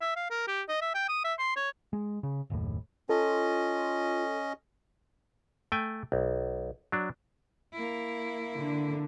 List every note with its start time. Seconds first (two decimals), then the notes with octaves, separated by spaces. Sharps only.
0.01 E5
0.16 F5
0.30 A#4
0.47 G4
0.69 D#5
0.81 E5
0.94 G5
1.09 D#6
1.24 E5
1.39 C6
1.57 C#5
1.93 G#3
2.23 C#3
2.50 F#1 D#2 A2
3.09 C#4 F4 A4 D#5
5.72 A3 G5 G#5
6.12 B1
6.92 F#3 D4
7.73 A#3 E4
8.57 D3